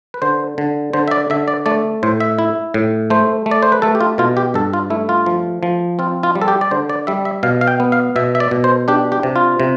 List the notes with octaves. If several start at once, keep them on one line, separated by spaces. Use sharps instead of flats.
B4
D3 C5
D3
D3 C5
E5
D5
D3 E5
D5
A3 D5
A2 C5
E5
E4
A2
A3 C5
A3
D5
C5
B4
A3 A4
G4
F4
B2 F4
G4
G2 A4
F4
A3 E4
F4
F3
F3
C4 F4
F4
G3
A4
G4
D5
D3 C5
D5
G3 E5
E5
B2 F5
F5
G5
B3
F5
B2 E5
E5
D5
B2
C5
D4 G4
G4
C3
F4
C3